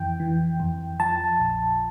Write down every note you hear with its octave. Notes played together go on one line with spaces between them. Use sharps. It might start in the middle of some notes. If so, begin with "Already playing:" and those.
Already playing: F2 E3 G5
E3
F2
F3 A5
A#1